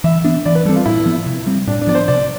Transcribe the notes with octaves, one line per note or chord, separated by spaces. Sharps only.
E3 E5
B3 D4
E3 D5
B4
G3 C4 A4
F4
A2 E4
F3 B3
C3
G3 C4
A2 D4
D4
F3 B3 D5
C5
C3 D5